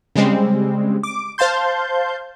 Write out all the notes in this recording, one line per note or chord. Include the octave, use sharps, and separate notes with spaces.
C#3 G3 G#3 C4
D6
C5 F5 A5 C6 G6